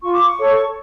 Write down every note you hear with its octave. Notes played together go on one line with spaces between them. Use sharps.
F4 C#6
D6
C#6
A4 C#5